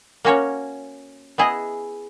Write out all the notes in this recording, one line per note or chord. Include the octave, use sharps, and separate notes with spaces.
A#3 C#4 F#4 C#5
B3 E4 G#4 D#5